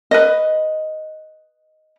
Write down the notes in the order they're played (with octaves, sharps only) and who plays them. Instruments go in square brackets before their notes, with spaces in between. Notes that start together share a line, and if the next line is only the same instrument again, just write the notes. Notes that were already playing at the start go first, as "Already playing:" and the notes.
[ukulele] B4 D#5